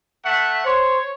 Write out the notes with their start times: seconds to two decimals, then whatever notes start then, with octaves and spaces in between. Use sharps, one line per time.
0.25 A3 E5 F#5
0.66 C5 C#5